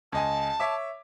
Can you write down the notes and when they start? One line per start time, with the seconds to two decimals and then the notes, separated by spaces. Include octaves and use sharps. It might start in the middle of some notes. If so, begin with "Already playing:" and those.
0.12 C#2 D#5 G#5 A5
0.60 C#5 E5 D6